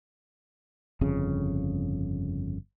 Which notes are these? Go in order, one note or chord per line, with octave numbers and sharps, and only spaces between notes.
G1 F2 C#3